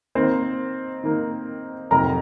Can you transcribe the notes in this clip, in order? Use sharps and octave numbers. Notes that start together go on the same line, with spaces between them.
D#3 A#3 C4 D#4 C5
D#3 A#3 D#4
F2 C3 F#3 C4 D#4 A#4 A#5